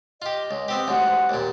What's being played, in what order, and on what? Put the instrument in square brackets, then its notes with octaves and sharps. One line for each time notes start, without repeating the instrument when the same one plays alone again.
[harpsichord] F4 G4 [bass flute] D#5
[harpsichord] C#2
B3 C4 G4
[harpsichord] A1 D2 G#2 [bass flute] F#5
[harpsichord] D#2 A#2